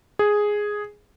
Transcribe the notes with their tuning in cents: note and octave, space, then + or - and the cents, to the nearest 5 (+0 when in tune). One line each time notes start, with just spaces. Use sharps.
G#4 +0